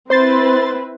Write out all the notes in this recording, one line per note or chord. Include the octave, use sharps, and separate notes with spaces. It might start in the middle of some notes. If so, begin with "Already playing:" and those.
C4 E4 B4 C5 C6 A6